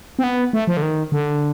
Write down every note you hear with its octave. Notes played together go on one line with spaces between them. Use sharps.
C4
B3
A3
F3
D3
D#3
D3